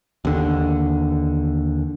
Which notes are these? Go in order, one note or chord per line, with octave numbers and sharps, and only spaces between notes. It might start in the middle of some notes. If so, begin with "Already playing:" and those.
D#2 D3